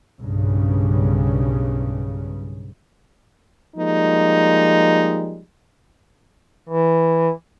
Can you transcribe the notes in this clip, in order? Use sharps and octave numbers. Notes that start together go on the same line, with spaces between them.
B1 G2 C#3
F3 G3 G#3 A#3 D#4
E3